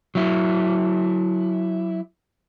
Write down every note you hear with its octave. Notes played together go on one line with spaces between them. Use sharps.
F#3 E4